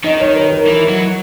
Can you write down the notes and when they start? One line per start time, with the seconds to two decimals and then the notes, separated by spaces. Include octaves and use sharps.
0.05 D#3 D#5
0.20 C#5
0.36 B4
0.52 A#4
0.67 E3 A#4
0.89 F#3